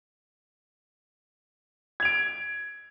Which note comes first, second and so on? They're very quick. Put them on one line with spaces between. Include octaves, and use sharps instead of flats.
G#6 F7 D7